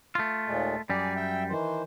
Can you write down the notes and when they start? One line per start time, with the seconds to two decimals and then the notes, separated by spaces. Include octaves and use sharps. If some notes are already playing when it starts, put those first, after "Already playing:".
0.15 A3 F4
0.47 D#2 A#2 G#3
0.90 F#2 G3 G#4 D5
1.16 E5 G5
1.50 D#3 E3 C5